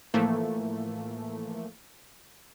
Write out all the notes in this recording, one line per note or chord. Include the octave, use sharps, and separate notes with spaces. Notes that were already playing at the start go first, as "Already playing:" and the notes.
A2 E3 F3 A3 A#3